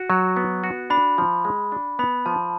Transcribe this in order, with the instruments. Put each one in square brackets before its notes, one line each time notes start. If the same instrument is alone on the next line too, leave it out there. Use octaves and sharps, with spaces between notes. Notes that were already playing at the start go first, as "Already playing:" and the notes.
Already playing: [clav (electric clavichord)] F#4
F#3
B3
F#4
[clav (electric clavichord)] D4 [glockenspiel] B5
[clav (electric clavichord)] F3
G#3
D4
[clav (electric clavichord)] B3 [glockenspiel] B5
[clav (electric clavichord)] F3 [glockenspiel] A5